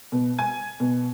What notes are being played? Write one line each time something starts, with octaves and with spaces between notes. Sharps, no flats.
B2
G#5
B2